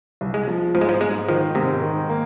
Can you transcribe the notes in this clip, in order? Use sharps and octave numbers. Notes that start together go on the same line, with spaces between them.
C2
G#3
F3
G#2 F3
G#3
F3
G#2 G#3
D#3 F3
G#2 C3
D#3
A#3